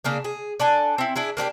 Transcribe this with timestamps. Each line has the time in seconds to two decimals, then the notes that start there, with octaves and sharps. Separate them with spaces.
0.04 C#3 A#3 D4
0.24 G#4
0.60 D4 A4 G#5
0.98 C4 E4
1.16 D4 E4 G#4
1.37 A#3 D4 F#4 G4